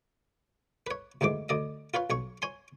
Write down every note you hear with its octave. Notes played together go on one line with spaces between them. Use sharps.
B4 C#5
D2 G#2 E3 G#3 D6
D2 D5 D#5
F4 B4 C#5 F5
B1 C#5 C#6
C#5 G#5 C6